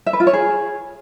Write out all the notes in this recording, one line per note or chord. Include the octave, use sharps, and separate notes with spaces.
E5
B4
F4
C#5
G#4